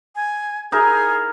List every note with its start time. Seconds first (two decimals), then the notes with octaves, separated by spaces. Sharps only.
0.16 G#5
0.72 D#4 E4 G#4 A#4